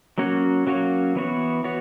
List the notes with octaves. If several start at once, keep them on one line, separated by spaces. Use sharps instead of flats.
F#3 A#3 C#4 F#4 C#5
F#3 A#3 C#4 F#4 C#5
E3 B3 F#4 C#5
E3 B3 F#4 C#5